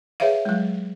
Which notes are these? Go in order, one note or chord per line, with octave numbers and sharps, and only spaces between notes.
G#4 B4 C#5 E5 F5
F#3 G#3